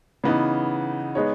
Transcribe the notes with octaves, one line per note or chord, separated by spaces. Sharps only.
C#3 E3 B3 D#4
G#3 B3 D#4 G#4 C#5